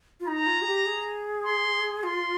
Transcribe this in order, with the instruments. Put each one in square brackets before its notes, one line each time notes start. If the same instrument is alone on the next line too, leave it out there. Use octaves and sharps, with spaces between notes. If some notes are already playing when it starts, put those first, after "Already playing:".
[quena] F4
[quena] D#4 [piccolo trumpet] A#5
[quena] F4
G#4
G4
G#4
[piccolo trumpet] C6
[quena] F4 [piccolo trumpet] C6